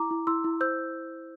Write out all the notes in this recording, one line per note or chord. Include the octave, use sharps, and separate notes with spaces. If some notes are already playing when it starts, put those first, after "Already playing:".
Already playing: E4 A#5 D6
E4
E4 C6 E6
E4
C5 E6 G6